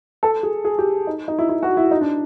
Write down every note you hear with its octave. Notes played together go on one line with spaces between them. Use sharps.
A4
G#4
G#4
G4
D#4
D#4
E4
E4
F#4
E4
D#4
D4